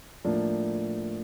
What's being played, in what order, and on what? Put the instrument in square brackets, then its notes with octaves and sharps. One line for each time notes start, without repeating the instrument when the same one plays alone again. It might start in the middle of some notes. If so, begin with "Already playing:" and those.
[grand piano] A2 F3 A#3 D4